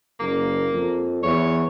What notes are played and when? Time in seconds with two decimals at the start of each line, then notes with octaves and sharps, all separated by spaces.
0.20 F#1 A#3
0.73 F2
1.23 E2 C#5